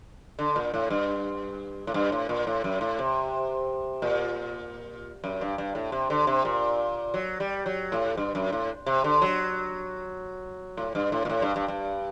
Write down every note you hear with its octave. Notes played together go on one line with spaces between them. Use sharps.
D3
A#2
A2
G2
A2
G2
A2
A#2
A2
F#2
A2
C3
A#2
F#2
G2
G2
A2
C3
D3
C3
A#2
F#3
G3
F#3
A2
G2
F#2
A2
C3
D3
F#3
A2
G2
A2
A#2
A2
G2
G2
G2